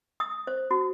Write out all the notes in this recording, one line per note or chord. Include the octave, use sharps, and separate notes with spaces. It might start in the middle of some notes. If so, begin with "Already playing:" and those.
D#6
C5
F#4